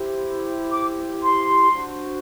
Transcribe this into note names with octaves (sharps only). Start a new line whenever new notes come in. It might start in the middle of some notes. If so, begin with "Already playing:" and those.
Already playing: E4 G4 C5
D6
C6
D4 F#4 C5